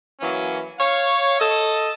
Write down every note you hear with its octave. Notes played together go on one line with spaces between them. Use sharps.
E3 F#3 A#3 C#4
C#5 F5
A4 D#5